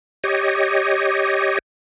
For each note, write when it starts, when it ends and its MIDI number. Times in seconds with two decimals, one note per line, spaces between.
0.24 1.59 67
0.24 1.59 73
0.24 1.59 75